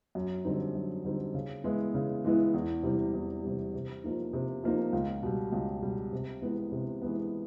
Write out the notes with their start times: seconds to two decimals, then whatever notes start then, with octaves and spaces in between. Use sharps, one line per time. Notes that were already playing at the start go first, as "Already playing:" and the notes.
0.15 F#2
0.45 D3 G3 C4 D#4
0.75 F#2
1.04 D3 G3 C4 D#4
1.34 C#3
1.64 E3 G#3 B3 E4
1.94 C#3
2.24 E3 G#3 B3 E4
2.54 E2
2.83 C3 E3 G3
3.14 E2
3.43 C3 E3 G3
3.74 C3
4.04 F3 A#3 D#4
4.33 C3
4.64 F3 A#3 D#4
4.93 C#2
5.23 B2 G3
5.52 C#2
5.82 B2 G3
6.12 C3
6.42 E3 G#3 B3
6.72 C3
7.02 E3 G#3 B3